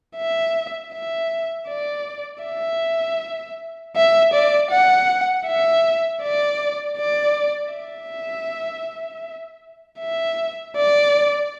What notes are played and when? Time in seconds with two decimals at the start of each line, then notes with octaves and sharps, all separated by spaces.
0.16 E5
0.93 E5
1.68 D5
2.44 E5
3.96 E5
4.33 D5
4.70 F#5
5.46 E5
6.22 D5
6.97 D5
7.73 E5
10.00 E5
10.77 D5